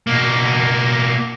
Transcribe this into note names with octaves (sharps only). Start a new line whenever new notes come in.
B2 A#3